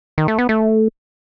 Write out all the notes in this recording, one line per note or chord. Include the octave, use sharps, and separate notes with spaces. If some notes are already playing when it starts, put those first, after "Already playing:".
D#3
A3
B3
A3